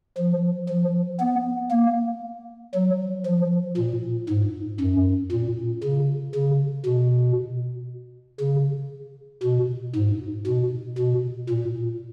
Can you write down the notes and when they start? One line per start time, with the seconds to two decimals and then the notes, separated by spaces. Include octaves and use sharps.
0.17 F3
0.69 F3
1.20 B3
1.71 A#3
2.75 F#3
3.26 F3
3.77 A#2
4.29 G#2
4.80 F#2
5.32 A#2
5.84 C#3
6.35 C#3
6.86 B2
8.41 C#3
9.43 B2
9.95 G#2
10.47 B2
10.98 B2
11.49 A#2